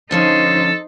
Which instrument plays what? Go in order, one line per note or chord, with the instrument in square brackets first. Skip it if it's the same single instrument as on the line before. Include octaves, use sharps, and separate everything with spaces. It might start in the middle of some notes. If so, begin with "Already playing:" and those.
[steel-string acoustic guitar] D3 F3 C#4 [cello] D#4 C5 [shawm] A4